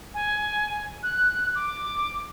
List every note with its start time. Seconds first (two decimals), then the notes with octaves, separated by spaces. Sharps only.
0.14 G#5
1.03 F#6
1.55 D6